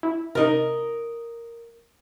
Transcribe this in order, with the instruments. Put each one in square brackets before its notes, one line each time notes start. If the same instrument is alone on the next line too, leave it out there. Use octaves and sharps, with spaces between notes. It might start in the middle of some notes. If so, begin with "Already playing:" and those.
[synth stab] E4
[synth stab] C3 D#4 [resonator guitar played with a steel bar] A#4 D#5